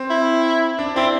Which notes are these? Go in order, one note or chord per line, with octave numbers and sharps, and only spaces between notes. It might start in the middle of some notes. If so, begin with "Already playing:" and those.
Already playing: C4
E4
D4
C4 E4